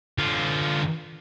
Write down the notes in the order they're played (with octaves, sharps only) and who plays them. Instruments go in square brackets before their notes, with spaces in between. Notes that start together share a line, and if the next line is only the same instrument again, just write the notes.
[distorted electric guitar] D3 F4